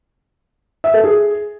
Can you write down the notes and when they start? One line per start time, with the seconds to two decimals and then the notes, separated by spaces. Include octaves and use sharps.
0.84 E5
0.94 A4
1.04 G#4